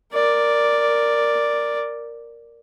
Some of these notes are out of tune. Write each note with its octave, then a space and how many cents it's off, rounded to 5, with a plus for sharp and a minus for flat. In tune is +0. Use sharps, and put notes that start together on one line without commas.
A#4 +0 D5 +0